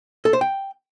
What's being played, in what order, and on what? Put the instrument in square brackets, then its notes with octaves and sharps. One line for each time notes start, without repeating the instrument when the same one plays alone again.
[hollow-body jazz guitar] A4
C5
G5